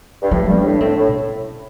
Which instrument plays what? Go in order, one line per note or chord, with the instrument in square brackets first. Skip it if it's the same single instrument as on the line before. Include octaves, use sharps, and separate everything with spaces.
[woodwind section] G2
[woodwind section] A2 [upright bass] F3
[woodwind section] G2
[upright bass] D4
[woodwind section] A2
[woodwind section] A2 [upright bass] C4
[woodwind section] A2
[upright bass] B2